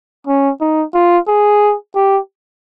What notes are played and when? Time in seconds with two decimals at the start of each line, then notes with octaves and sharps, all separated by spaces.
0.27 C#4
0.61 D#4
0.94 F4
1.28 G#4
1.95 G4